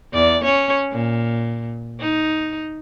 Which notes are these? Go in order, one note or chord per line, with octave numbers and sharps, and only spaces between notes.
E2 D5
C#4 C#5
A#2
D#4